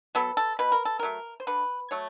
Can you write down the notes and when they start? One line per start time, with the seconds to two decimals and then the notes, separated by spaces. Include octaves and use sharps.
0.15 F#3 B3 A4
0.37 A4
0.59 B2 B4
0.72 A#4
0.85 A4
0.99 F#3 A3 A#4
1.40 C5
1.47 D3 B4
1.91 F#3 A3 C#5